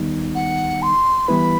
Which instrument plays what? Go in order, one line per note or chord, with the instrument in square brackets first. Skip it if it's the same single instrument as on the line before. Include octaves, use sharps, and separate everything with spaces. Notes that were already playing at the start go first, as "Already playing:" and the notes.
Already playing: [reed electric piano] D#2 D#3 G3 B3 D#4
[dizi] F#5
C6
[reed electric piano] E3 G3 B3 E4 B4 [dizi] B5